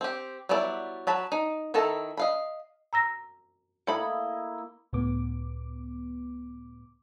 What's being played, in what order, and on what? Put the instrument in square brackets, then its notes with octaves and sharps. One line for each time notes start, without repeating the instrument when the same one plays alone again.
[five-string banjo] C4 G4
F#3 G3 B3 E4 D5
F#3 A5 B5
D#4
D#3 E4 A4 A5 A#5
D#5 F5 B5
[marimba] A#5 E6 A#6
[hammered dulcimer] A#3 E4 D#5 [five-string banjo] A4 B5
[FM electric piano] C#2 A2 B3 D6